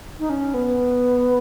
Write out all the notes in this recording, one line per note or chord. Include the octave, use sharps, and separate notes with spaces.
D#4
C#4
B3